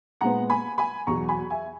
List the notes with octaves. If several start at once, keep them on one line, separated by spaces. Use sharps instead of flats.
A#2 G#3 B3 F#5 A#5
G#5 B5
G#5 B5
E2 B2 F#3 A#5 C#6
G#5 B5
E5 G#5